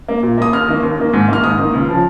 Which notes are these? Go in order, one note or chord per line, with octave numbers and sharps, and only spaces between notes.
A#3
A#2
A#3 D#6
D#2 F6
D#3 A#3
D#2
D#3 A#3
G#2
D#3 A#3 F6
G#2 D#6
D#3 A#3
C#2
C#3 F3